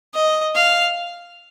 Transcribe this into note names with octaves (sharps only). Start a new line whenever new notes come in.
D#5
F5